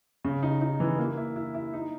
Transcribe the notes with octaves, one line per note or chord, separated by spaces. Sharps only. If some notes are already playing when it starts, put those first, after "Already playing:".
C#3
D#4
D#4
E3
A#3
E4
E4
E4
D#4